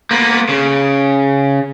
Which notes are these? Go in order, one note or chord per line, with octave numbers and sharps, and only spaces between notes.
A#3 B3
C#3